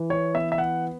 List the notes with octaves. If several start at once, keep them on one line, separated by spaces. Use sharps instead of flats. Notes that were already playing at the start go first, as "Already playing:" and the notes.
Already playing: E3
C#5
B3 E5
E5
F#5